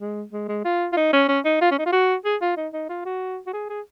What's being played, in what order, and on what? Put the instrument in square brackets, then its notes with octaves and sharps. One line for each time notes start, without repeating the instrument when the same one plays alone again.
[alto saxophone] G#3
G#3
G#3
F4
F4
D#4
C#4
C#4
D#4
F4
C#4
D#4
F4
F#4
G#4
F4
D#4
D#4
F4
F#4
F#4
G#4
G#4